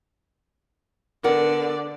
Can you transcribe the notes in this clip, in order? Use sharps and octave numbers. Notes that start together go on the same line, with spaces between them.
D3 B3 A#4 D5 F#5